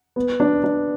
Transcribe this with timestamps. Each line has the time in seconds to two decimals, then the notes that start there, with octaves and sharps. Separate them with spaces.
0.16 B3
0.40 D4
0.64 D4